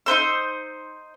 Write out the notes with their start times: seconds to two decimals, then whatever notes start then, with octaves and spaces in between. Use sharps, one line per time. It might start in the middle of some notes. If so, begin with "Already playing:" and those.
0.06 D#4 B4 C5 E6